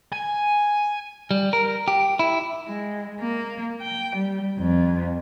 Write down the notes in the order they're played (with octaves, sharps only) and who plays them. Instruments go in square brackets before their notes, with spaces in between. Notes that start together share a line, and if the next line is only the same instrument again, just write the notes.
[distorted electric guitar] G#5
[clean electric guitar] G3
A#4
G4
E4
[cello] G#3
A#3
G5
G3
F2